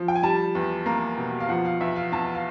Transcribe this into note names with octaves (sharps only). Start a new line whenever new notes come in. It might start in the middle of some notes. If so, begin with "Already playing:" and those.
Already playing: F3
G5
G#5
G3 A5
E2
A#3 A#5
B2
F5
F3 F#5
F5
E2 E5
F5
E2 A5
F5